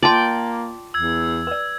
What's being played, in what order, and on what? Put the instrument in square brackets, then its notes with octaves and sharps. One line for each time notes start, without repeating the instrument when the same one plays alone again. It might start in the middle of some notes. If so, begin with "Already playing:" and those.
[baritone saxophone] A#3 [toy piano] F4 A5 C6 [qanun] D5 G5
[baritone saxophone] E2 [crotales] E6 G#6
[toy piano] B4 D5